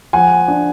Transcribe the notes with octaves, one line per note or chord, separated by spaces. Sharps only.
F3 F#5 G#5
D4